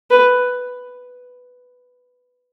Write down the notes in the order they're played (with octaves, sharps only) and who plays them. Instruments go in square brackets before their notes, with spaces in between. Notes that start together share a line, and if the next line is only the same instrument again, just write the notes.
[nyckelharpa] B4